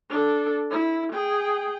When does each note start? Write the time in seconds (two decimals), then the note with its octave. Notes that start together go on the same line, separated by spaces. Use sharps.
0.10 D4 A4
0.71 E4
1.13 G#4 G5